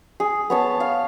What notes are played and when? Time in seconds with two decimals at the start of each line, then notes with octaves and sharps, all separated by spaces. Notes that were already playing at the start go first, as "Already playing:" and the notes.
0.20 G#4
0.50 B3 C#5 A5
0.80 F5